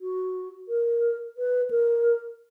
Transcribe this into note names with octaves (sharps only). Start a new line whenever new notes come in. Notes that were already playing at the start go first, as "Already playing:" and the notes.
F#4
A#4
B4
A#4